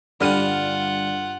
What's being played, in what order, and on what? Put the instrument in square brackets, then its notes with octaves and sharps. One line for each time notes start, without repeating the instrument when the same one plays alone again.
[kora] G2 [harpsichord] D3 G3 [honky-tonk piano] D4 F6 D#7 [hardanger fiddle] F4 F#5